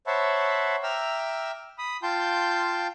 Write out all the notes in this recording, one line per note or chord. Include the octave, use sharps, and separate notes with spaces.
C5 C#5 E5 F#5 A5 B5
E5 G5 A#5 D6 E6 F6
B5 D#6
F4 G5 A5 C6 G6